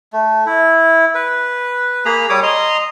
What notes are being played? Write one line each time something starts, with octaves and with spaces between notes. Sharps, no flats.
A3
E4
B4
A#3 G#4 A#5 B5
G3 C#5 D6 D#6
D#5 A#5 C6